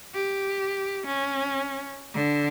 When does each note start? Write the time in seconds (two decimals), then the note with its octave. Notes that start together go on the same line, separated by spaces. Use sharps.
0.14 G4
1.06 C#4
2.14 D3